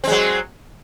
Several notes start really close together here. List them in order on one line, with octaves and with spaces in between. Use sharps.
C4 G#3 F#3